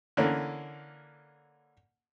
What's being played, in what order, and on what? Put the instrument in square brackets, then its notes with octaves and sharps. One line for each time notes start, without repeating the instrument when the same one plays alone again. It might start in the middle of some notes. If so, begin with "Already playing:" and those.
[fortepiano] D3 E3 A#3 C#4